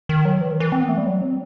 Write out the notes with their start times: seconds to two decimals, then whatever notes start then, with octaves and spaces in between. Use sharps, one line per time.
0.09 D#3
0.25 F#3
0.41 E3
0.51 D#3
0.60 E3
0.72 C4
0.81 B3
0.89 A3
0.97 G3
1.06 F#3
1.22 C4